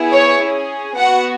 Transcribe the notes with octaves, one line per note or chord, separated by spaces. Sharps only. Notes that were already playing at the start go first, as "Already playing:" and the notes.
Already playing: B3 E4 G#4
C#5
C#4 G#4
B3 F#4 F#5